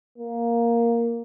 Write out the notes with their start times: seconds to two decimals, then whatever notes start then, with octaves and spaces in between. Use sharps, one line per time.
0.18 A#3